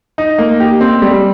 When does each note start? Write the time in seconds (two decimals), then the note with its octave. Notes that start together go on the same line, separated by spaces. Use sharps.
0.18 D#4
0.38 A#3
0.60 G4
0.81 C4
1.02 G3